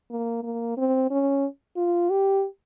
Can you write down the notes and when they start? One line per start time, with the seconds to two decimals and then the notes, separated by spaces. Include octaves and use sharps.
0.11 A#3
0.43 A#3
0.77 C4
1.11 C#4
1.77 F4
2.10 G4